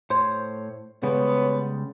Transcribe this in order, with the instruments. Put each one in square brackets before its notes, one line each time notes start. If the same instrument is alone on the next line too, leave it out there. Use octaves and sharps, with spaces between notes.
[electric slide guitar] A2 C5 C#5 [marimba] C6
[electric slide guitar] C#3 G3 G#3 [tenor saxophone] B3 [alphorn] C#5